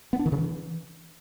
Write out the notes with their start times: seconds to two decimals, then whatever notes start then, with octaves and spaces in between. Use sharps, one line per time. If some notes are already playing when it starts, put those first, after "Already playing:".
0.13 B3
0.19 D4
0.26 D#3
0.32 C#3
0.38 E3